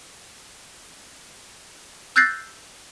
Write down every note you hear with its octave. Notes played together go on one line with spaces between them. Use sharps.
E6 F#6 G6 A6 A#6 C7